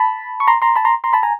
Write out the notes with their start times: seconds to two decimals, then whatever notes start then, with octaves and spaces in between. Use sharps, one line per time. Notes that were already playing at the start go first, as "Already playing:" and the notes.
Already playing: A5 B5
0.40 C#6
0.48 A#5 C6
0.62 A#5 C6
0.76 A5 B5
0.85 A#5 C6
1.04 A#5 C6
1.13 A5 B5
1.23 G#5 A#5